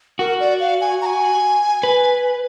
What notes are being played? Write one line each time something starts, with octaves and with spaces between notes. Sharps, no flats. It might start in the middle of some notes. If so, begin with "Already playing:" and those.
F#4 A#4
D5
F5
G#5
A#5
G#5
B4